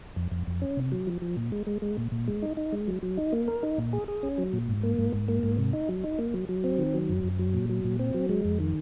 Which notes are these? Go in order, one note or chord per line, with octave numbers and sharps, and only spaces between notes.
F2
F2
F2
C#4
C3
F#3
F3
F3
A#2
G#3
G#3
G#3
A#2
A#2
G#3
D#4
D#4
G#3
F#3
F#3
D#4
A#3
A#4
D#4
A#2
G#4
G#4
C#4
F#3
A#2
G#2
A#3
G#2
G#2
A#3
G#2
C3
D#4
F#3
D#4
A#3
F#3
F#3
C4
D#3
F#3
F#2
F#2
F#3
A#2
F#3
A#2
C4
F#3
G#3
F2
D#3